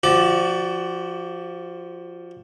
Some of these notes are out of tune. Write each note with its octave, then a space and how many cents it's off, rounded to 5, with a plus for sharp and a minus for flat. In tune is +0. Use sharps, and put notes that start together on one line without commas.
F3 +0 F#4 +30 D5 +0